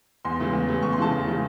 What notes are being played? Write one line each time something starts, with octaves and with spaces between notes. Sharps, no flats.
E2 C6
C#3 E3 A3
E2
C#3 E3 A3
E2 C#6
C6
C#3 E3 A3 A5
E2
C#3 E3 A3